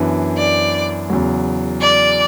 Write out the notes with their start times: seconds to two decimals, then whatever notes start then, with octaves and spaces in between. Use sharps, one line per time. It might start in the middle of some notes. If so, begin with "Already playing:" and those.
Already playing: F#2 E3 B3 D4
0.38 D5
1.10 E2 C#3 F#3
1.81 D5